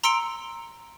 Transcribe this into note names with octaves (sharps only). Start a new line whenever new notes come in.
A#5 C6 E6 C#7 D7 G7